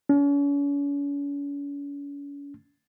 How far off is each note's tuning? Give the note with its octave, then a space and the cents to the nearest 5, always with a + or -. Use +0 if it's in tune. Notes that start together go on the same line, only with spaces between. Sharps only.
C#4 +40